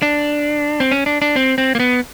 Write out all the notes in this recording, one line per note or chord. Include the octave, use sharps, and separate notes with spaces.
D4
C4
C#4
D4
D4
C4
C4
A#3
B3